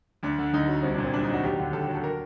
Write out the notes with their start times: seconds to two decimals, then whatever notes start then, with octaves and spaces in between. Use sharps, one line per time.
0.23 D2 D4
0.38 D3
0.53 D2 D#4
0.68 F#3
0.83 C2 C4
0.94 D4
0.98 A#2
1.04 C4
1.13 C2 D4
1.23 D#4
1.29 F#3 F#4
1.43 D#2 G4
1.59 D3
1.73 D#2 A4
1.88 F#3
1.95 A4
2.04 A#4